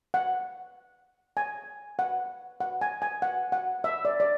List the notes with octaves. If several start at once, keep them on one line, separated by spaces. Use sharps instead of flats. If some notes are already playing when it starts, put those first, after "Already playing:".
F#5
G#5
F#5
F#5
G#5
G#5
F#5
F#5
E5
D5
D5